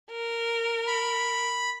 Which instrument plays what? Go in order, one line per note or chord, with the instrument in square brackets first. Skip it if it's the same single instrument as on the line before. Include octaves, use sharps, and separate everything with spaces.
[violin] A#4
[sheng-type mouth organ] B5